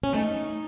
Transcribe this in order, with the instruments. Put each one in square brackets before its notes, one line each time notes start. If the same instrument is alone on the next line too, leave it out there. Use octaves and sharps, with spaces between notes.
[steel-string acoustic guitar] C#4
[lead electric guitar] A3 [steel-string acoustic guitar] D#4